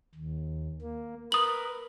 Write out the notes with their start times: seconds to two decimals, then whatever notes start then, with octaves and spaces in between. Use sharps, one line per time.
0.15 D#2
0.81 A#3
1.32 A#4 B4 D#6 F#7